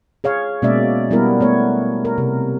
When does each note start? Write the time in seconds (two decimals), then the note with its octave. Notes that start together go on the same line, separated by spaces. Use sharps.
0.24 G#4 C#5 F5
0.62 B2 G#3 A#3 C#4 D5 E5
1.11 G3 B3 E4 A#4
1.40 A3 B3 C#5
2.05 A#4
2.18 C3